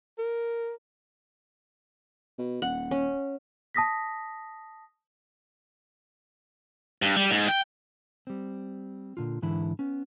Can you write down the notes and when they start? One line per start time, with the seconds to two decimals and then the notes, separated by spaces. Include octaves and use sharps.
0.18 A#4
2.39 B2
2.62 D#1 F#5
2.91 C#4
3.75 A5 D#6 A#6 B6
7.02 G2
7.16 G3
7.31 G#2
7.49 G5
8.27 G3 C4
9.17 A#2 D3 F4
9.42 G#2 D3 E3 E4 B5
9.79 B3 C#4